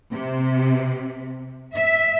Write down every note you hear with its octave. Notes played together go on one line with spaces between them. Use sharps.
C3
E5